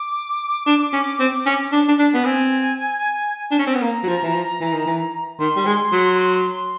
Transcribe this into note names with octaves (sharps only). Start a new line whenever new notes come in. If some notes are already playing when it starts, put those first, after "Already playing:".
Already playing: D6
D4
C#4
C4
C#4
D4
D4
D4
B3
C4 G#5
D4
C#4
C4
B3
A#3 A#5
F#3
F3
E3
F3
E3
D#3
E3
D#3 C6
G3
G#3
F#3